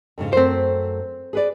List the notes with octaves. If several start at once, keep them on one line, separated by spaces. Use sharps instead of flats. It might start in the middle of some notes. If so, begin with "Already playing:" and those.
F2 G#2 C#3
F#2 A3 C4 C5
G#4 B4 D5